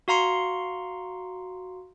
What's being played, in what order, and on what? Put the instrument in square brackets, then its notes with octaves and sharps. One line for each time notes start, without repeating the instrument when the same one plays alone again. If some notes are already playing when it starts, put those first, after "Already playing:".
[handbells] F#4 F5 A#5 C6 C#7